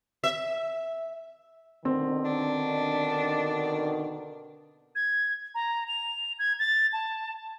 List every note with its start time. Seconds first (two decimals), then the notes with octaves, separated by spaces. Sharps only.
0.24 E5
1.85 B2 D3 D#3 C4
2.25 D4
4.96 G#6
5.55 A#5
5.88 F7
6.39 G#6
6.59 A6
6.93 A5